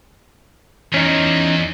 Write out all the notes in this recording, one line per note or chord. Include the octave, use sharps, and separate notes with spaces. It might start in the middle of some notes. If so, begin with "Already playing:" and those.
E2 C#4 D#4